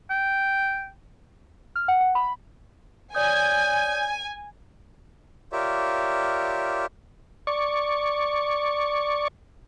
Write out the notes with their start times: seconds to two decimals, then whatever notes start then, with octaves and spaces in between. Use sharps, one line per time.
0.10 G5
1.76 F6
1.88 F#5
2.01 F#5
2.15 B5
3.15 C#5 D5 G#5 D#6 G6
5.52 F4 G4 A#4 C#5 D5 E5
7.47 D5 C#6